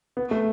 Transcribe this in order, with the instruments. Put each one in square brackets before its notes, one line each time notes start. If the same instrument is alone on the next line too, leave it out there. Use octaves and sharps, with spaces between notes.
[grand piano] B3
A3